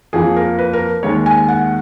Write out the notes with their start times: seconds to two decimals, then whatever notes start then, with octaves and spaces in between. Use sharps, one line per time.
0.13 F2 F3 A#3 G#4
0.36 A#4
0.59 B4
0.73 A#4
1.03 D#2 D#3 G#3 C#5
1.26 G#5
1.48 F#5